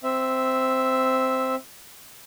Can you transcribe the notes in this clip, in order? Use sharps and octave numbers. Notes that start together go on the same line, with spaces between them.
C4 E5